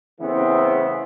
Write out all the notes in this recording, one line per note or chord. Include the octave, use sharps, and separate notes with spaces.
E2 C#3 E3 A3 B3 C4